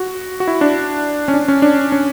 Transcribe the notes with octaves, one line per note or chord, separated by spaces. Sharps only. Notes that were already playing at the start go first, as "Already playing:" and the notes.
Already playing: F#4
F#4
E4
D4
C#4
D4
C#4
D4
C#4